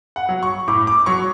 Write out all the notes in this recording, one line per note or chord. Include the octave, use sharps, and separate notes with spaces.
F#5
F#3
C#6
A2 D6
D6
F#3 C#6